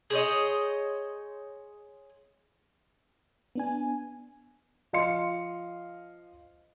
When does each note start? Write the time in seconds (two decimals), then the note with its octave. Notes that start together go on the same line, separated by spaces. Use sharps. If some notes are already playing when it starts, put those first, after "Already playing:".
0.10 G#4 C5 C#5 D#5
3.55 B3 D4 G#5
4.93 F3 D#5 F5 C6 C#7